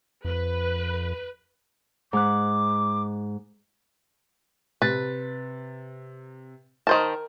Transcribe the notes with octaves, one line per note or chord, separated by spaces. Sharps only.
F2 B4
G#2 D6 F#6
C3 B4 A6
D#3 A#4 C5 A5